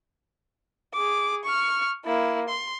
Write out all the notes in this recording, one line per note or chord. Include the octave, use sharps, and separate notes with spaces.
G#4 D6
C#6 F6
A#3 E4
C6